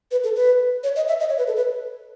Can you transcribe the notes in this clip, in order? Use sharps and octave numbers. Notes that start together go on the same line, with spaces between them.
B4
A4
B4
C#5
D#5
E5
D#5
C#5
B4
A4
B4